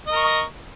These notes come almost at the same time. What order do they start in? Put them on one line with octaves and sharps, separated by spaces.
D#5 A#4 C#6